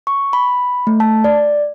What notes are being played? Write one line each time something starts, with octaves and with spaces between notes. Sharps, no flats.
C#6
B5
A3
A5
D5